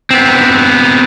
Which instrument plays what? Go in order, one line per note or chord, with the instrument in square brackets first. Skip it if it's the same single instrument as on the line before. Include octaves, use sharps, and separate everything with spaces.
[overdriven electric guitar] B3 C4